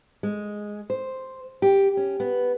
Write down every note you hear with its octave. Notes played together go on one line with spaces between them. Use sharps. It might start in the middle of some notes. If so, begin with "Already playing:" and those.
G#3
C5
G4
C#4
B3